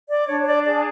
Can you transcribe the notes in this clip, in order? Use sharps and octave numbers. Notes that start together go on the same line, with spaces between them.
D5
D4 C#5
C#5
D5
G#4 D5